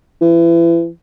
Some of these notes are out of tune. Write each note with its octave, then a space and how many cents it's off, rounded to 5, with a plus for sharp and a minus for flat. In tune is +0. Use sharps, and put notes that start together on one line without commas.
E3 +30